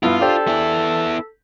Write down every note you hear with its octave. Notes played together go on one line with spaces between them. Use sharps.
G2 B3 E4 F4
D4 G4 A4 C5
B3 E4